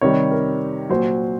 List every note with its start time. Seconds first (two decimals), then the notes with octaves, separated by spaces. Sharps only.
0.01 C3 D#3 G3 C#5
0.31 A#4
0.89 A#2 F#3 C5